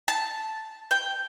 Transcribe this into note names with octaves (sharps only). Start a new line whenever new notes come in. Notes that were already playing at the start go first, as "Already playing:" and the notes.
A5
G5